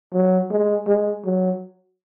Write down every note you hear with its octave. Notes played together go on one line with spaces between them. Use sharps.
F#3
G#3
G#3
F#3